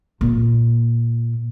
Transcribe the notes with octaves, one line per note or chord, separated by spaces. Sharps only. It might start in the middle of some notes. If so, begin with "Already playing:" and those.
A#2